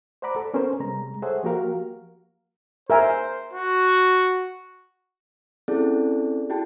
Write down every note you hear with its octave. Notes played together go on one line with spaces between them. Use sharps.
C5 D5 F#5 A#5 B5 D6
A4
B3 C#4 A4 A#4 C5
C3 G3 G#3 A#5
G#4 A4 C5 C#5 E5 F#5
F3 A#3 F#4 G4 A#4 F5
A#4 C5 E5 G#5
F#4
C4 C#4 E4 G#4 A4 D5
E4 F#4 G#4 G5 A5